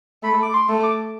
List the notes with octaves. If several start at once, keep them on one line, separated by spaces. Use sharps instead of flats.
A3 B5
D6
C6
A3
D6